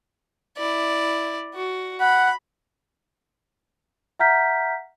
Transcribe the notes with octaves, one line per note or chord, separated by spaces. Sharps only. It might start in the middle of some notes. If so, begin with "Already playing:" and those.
E4 D5
F#4
F#5 B5
E5 F#5 A#5 F6 G6 B6